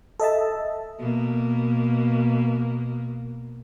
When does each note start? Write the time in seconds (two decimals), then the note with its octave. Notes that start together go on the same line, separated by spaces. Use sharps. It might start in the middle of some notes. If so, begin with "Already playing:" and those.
0.20 A4 D#5 E5 A5
1.00 B2 A#3